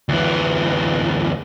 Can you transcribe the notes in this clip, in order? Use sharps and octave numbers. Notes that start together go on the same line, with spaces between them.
D2 E3